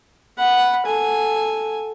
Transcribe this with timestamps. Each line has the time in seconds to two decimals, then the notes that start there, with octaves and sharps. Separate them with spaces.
0.38 F#5 B5
0.86 A4 G#5